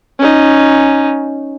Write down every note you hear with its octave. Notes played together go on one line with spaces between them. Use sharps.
C#4 D#4